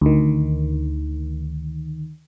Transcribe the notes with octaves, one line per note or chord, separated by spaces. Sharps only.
D2 D#3